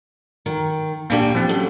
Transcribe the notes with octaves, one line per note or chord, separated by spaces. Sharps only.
D#3
A#2 A#3 D4 G4 B4 G5
F3 C4
F#2 A4